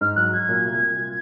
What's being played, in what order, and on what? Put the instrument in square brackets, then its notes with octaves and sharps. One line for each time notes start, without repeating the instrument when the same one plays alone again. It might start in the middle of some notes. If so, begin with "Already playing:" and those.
[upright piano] G#2 [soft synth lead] F6
[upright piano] F#3 [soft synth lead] F#6
[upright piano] F#3 [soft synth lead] G#6
[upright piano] A#2
C2
C2
F4